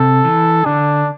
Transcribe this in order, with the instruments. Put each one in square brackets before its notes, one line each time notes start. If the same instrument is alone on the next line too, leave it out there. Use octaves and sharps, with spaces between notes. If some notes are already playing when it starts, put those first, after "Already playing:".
Already playing: [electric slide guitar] C3 [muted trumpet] A4
[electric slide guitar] E3
[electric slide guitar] D3 [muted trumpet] D4